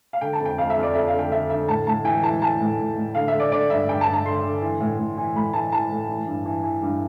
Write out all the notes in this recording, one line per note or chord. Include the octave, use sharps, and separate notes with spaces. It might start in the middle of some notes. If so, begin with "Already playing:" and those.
F5
D3 G5
A5
F2
G5
F2 F5
E5
F2
D5
F2 E5
F5
D3
G5
D3 E5
D3 E5
A2 A5
A2 A5
E3 G5
E3 A5
E3 A5
A2
A2
A2
D3 F5
E5
D3
D5
D3 D5
G2 E5
G2 G5
A5
G2
A5
D3 C6
D3
E3
A2
A2
E3
A2 B5
E3 A5
E3 A5
A2
E3
G2
E3
E3
G2